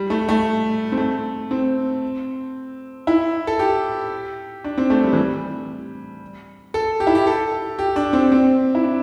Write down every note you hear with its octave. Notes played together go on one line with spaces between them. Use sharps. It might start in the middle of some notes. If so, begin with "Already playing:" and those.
Already playing: G3
A3
A3
C4
A3
C4
E4
A4
G4
D4
C4
A3
G3
E3
G3
A4
G4
E4
G4
A4
G4
D4
C4
C4
E4
D4